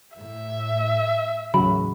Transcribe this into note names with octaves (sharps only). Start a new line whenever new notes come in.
A2 E5
A1 D#2 C#3 E3 F#3 F#4 B5